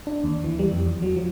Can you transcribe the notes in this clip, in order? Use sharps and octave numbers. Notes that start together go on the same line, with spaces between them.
D4
D#2
E3
G3
F2
E2
F#3
F3